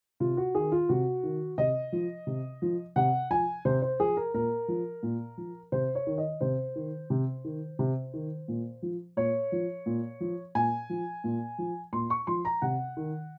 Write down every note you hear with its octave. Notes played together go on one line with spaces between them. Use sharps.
C3 F4
F#4
D#3 G#4
F4
C3 F#4
D#3
C3 D#5
F3
C3
F3
C3 F#5
F3 G#5
C3 C5
C5
F3 G#4
A#4
A#2 A#4
F3
A#2
F3
C3 C5
C#5
D#3
D#5
C3 C5
D#3
C3
D#3
C3
D#3
A#2
F3
A#2 C#5
F3
A#2
F3
A#2 G#5
F3
A#2
F3
A#2 C6
C#6
F3 C6
A#5
C3 F#5
D#3